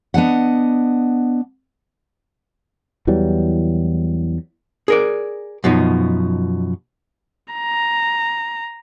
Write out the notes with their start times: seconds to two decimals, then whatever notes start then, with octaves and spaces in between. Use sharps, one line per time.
0.14 B3 D4 D#5 F#5
3.07 E2 E3 F#3 G3
4.88 G#4 A#4 D5
5.64 F#2 B2 F3 D#4
7.54 A#5